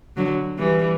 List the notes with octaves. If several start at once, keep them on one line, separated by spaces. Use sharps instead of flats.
D3 F#3
E3 G3